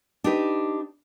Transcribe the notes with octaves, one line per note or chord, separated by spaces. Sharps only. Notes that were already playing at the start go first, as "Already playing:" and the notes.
D4 D#4 G4 B4